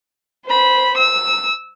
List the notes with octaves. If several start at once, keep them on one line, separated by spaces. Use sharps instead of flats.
C5 B5
E6